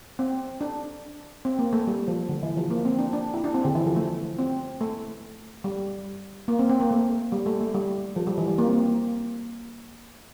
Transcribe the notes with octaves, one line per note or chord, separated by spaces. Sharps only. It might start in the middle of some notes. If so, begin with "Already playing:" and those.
C4
D4
C4
A#3
A3
G3
F3
D3
E3
F3
A#3
C4
D4
D4
E4
D4
C4
D3
E3
F3
A3
C4
A3
G3
A#3
C4
C4
A#3
A3
G3
A3
A3
G3
F3
G3
E3
G3
A#3
C4
A#3